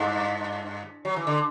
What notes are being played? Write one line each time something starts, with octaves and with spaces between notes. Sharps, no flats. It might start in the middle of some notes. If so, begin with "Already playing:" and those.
Already playing: G2
F#3
E3
D3